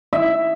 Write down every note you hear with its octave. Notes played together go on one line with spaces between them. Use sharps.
E5